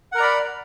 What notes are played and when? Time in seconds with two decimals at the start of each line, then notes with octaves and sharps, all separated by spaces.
0.12 F#5
0.15 A#4
0.17 A#5
0.20 D5
0.22 B5